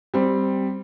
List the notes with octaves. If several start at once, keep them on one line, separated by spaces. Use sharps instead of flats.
G3 C4